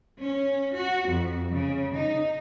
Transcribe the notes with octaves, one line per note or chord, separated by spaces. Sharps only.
C#4
F#4
F2
C#3
D#4